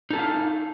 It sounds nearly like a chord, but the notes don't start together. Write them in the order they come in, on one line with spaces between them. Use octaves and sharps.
D#4 A4 E4 F5